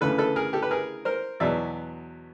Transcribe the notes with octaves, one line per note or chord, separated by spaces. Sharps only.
D2 C#3 E3 A4 B4
A4 B4
G#4 A#4
G4 A4
B4
G#4 A#4
A#4 C5
E2 B2 F#3 B3 D5 E5